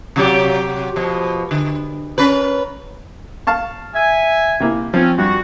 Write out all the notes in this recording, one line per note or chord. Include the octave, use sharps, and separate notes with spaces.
C3 F#3 G4
B2 F3
D3
C#4 A#4 B4
F5 A5 C#6
E5 G#5
C3 A#3 E4
F3 C4 C#4
G2 F#4